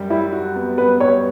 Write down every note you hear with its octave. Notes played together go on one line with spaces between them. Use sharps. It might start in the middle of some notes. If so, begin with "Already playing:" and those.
Already playing: F#2 G3
G3 E4
F#4
B3
B3 B4
G3 C#5